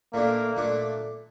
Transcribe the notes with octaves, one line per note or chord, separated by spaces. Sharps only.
A#2 A3 A#3 D4
A#2 A3 D4